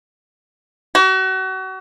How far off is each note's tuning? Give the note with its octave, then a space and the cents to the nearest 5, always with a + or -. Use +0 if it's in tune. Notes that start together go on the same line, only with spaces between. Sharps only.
F#4 +35